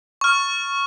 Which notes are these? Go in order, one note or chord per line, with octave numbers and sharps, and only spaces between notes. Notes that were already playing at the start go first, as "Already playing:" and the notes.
C#6 F6